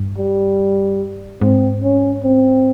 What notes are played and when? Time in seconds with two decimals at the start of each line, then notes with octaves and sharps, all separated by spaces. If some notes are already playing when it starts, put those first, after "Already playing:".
Already playing: G2
0.18 G3
1.41 G#2 C4
1.83 C#4
2.24 C4